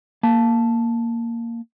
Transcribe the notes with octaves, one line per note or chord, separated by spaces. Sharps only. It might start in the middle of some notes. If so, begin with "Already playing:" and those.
A#3 A5